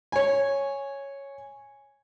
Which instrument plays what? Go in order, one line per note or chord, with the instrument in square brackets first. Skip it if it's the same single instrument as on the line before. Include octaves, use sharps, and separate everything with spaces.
[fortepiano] C#5 G#5